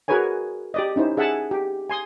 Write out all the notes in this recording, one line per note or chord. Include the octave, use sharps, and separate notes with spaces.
F#4 G#4 A#4 B4 C#5 G#5
G4 D5 D#5
C#4 D#4 E4 C5
G#4 E5 F#5 G#5 A5
G4
G#5 C6 D#6